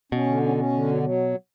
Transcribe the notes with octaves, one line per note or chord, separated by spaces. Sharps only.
B2 C#4
D3
C#4
C#4
D3
F#3
F#3